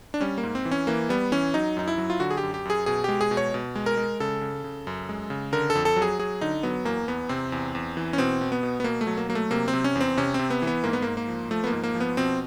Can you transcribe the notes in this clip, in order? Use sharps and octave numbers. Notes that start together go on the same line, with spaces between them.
D4
G3 C#4
A#3
G#2
C4
E3
C#4
E3 A#3
G3 B3
E3 C#4
F#3 D#4
F#2 D#4
E4
F#3
F4
D3 F#4
G#4
G4
F#2
G4
F#2 G#4
B2 G#4
G#3 G4
G#4
B2
C#5
B2
G#3
A#4
G#3
C#3 A4
C#3
C#3
F#2
G#3
C#3
D3 A#4
A4
F2
A4
F#3
G#4
F#3 G#4
D3 D#4
F#3 B3
E2 A#3
E2 B3
C3 C4
E2
E2
E3
C#4
B2 C4
B2
B3
B2
B3
B2 A#3
A3
F#3
A#3
F#3 A#3
A3
C3 A#3
C4
C3
C#4
E2
C4
C3 C#4
C4
C3
B3
E3
B3
G#2 A#3
B3
G#2 A#3
A#3
F3
F3 A3
B3
A#3
G#2
A#3
F3
B3
B2 C4